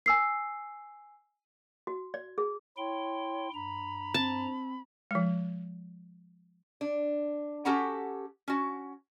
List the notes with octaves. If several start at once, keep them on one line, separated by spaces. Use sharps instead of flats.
G#5 E6 C7
F#4
D5
G#4
E4 C#5 G5 C6
G2 A#5 B5
C4 A5
F3 G#3
D4
C#4 F#4 G4 A4 F#5 A#5
C#4 F#4